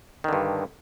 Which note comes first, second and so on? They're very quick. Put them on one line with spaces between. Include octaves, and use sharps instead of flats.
D#3 D3 G2